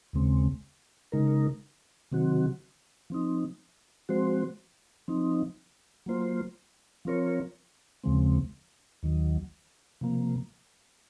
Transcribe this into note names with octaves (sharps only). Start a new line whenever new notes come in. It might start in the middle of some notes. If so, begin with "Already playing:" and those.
D#2 C#3 G#3 C4
C#3 G#3 D#4 A#4
C3 D#3 F#3 C4 F#4
F3 C4 D#4
F3 G#3 C4 F#4 C5
F3 C4 D#4
F#3 A#3 F4 C5
F3 C4 F4 A#4 C#5
D#2 C#3 F3 G#3 C4
D#2 D#3 F#3
C3 F3 A#3